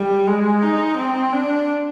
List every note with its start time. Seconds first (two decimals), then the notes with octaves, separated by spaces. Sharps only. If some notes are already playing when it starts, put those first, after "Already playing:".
Already playing: G3
0.27 G#3
0.62 D#4
0.97 C4
1.33 D4